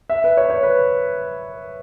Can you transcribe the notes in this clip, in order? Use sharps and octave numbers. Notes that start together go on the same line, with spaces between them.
E5
B4
C#5
C#5
B4